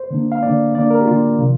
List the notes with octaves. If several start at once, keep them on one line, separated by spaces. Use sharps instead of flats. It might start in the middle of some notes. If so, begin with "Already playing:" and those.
Already playing: C5
D3 A#3 D4
F5
D3 A#3 D4 D5
D3 A#3 D4 D5
A#4
G4
D3 A#3 D4 F4
C3 F3